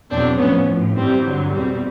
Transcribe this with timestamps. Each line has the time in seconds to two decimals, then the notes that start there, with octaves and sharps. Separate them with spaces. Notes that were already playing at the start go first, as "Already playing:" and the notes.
0.11 E2 B2 F#3 C4 D4
0.39 A2 F3 B3 C#4
0.67 A2 F3
0.95 G2 E3 G3 C4
1.25 G2 D3 F#3
1.52 E2 B2 G3 C4